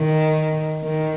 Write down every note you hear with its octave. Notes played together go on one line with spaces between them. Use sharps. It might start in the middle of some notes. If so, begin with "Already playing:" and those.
Already playing: D#3
D#3